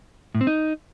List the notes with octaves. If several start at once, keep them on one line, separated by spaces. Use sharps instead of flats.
A2
C4
D#4